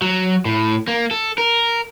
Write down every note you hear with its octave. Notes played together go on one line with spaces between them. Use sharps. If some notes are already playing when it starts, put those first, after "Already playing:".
F#3
A2
A#3
A4
A#4